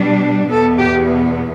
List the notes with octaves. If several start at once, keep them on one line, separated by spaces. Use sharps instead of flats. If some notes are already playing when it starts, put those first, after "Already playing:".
Already playing: B2 G3 D4
E2 B2 B3 A4
G4